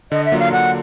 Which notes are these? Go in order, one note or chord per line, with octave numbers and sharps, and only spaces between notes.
D3 D#5
E5
F#3 A#3 D4 F4
F5
D3 F#5